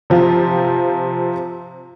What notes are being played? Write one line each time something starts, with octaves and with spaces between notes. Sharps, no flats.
C3 F3 C4 F4